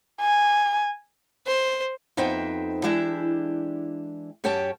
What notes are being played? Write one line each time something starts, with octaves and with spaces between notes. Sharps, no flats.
G#5
C5
F2 B3 D#4 C5 E5 G5
E3 G#3 D4 E4 G4 E5
F#2 C#4 G4 C#5 G5 A5